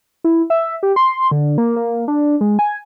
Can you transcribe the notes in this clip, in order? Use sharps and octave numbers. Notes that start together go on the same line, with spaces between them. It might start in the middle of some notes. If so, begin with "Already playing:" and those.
E4
E5
G4
C6
D3
A#3
A#3
D4
G#3
G#5